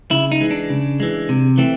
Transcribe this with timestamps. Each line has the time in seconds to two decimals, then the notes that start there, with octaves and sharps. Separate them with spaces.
0.11 C#3 E4
0.32 D#4
0.40 E3 G#3
0.51 D4
0.70 C#3
1.00 E3 G#3
1.29 C3
1.58 E3 A3 C4